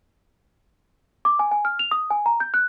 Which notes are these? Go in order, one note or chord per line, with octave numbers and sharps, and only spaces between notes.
D6
G#5
G#5
F6
F7
D#6
G#5
A#5
G6
F#6